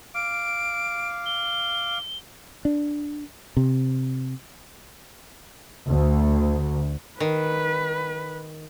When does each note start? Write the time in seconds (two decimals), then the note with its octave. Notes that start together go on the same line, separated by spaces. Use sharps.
0.15 F5 D6 D7
1.26 G7
2.65 D4
3.57 C3
5.89 D2
7.20 D#3 B4